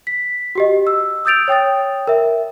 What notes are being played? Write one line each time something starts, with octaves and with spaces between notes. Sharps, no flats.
B6
F#4 G4 D#5
E6
D#6 E6 G6 A6 D7 F7
C#5 G5 D#6 A6
A#4 E5